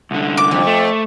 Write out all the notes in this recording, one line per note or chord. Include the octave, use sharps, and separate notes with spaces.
C2 D3
D6
F2
A3